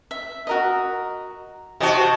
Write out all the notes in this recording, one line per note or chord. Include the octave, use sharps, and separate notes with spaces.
E5
F#4 A#4 D#5
C3 F#4 D#5 A5